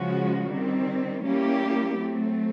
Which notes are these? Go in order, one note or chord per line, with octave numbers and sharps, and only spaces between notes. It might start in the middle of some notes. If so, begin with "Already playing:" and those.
Already playing: C#3 F3 G#3 C#4 F#4
D#3 G3 C4
G3 A#3 C#4 E4 G4
F#3 A3 C4